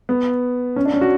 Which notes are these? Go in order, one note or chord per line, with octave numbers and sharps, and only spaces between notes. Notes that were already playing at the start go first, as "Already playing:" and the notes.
B3
C#4
D4
C#4
F#4